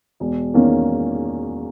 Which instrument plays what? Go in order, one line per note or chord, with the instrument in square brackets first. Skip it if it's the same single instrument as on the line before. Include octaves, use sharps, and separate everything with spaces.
[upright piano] E1
E2 D#3 A#3 C#4